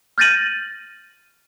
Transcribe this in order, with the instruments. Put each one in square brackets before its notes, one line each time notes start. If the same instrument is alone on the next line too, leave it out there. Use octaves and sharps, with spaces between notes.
[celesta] F6 G6 A6 A#6 D#7 F#7